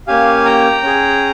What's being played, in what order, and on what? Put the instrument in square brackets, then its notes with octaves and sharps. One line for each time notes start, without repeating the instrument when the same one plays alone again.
[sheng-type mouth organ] A#3 C#4 G4 F5 G#5
G5 A#5
C#4 G#4